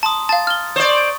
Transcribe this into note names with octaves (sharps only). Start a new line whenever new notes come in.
A5 A#5 C6 D#6
F5 A5 A6
F6 G7
C5 D5 C#6 D#6